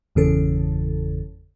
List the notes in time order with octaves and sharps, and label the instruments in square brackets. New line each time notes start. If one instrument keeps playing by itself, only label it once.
[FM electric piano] G1 E2 C#3 A4